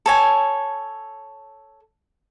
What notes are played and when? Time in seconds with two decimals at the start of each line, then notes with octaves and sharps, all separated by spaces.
0.06 A4 C#5 G#5